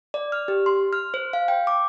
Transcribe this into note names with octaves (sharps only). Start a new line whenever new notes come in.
D5
F6
G4
C6
F6
C5
F5
G5
D6